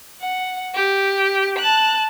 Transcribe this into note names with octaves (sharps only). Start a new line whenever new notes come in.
F#5
G4
A5 F#6